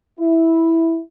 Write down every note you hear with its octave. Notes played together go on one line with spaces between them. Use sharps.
E4